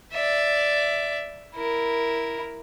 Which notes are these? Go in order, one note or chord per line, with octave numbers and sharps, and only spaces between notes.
D5 E5
E4 A#4